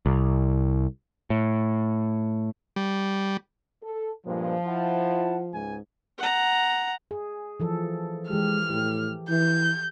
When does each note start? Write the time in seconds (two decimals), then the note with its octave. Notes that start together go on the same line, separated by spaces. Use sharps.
0.06 C2
1.30 A2
2.76 G3
3.83 A4
4.26 G2 A#2 F3 G#3
4.66 E4 F#5 A5
5.53 C#2 G#2 G#5
6.18 F#5 A#5
7.11 G#4
7.60 E3 F3 A4
8.30 E3 G#3 G4 F6
8.70 A2 G4
9.30 E3 G6